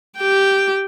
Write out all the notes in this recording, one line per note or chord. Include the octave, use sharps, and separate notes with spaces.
G4 G5